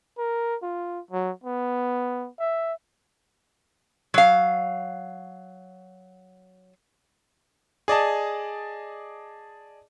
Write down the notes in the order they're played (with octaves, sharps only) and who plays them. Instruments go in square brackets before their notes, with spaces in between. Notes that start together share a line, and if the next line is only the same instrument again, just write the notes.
[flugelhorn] A#4
F4
F#3
B3
E5
[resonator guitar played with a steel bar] F#3 F5
[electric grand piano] G#4 D5 D#5 A5